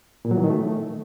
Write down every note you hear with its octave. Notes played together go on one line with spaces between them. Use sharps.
A#2
F#3
E3
D#3
A3